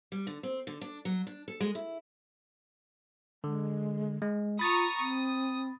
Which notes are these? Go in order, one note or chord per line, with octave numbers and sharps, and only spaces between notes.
G3
D3
C4
D3
D4
F#3
D4
A4
G#3
E4
D3 G#3
G#3
F4 A#5 B5 C#6 D#6 A6
C4 D#6